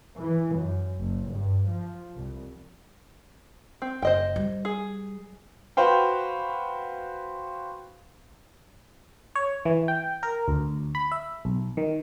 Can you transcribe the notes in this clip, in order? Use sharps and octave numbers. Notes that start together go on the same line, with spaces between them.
E3
F#2
F#1
G2
F3
C2
C4
F#1 C5 D#5 G5
G3
G#4
F#4 B4 C5 F5 G5
C#5
E3
G5
A#4
D2
B5
E5
B1
D#3